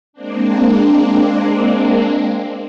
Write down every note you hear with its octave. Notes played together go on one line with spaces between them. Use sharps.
G#3 A#3 C4 D4